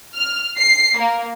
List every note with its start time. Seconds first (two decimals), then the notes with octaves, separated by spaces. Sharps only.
0.15 F6
0.59 C7
0.99 A#3